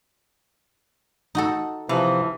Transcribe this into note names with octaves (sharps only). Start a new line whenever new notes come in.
D#4 F#4 A4
C3 E3 F3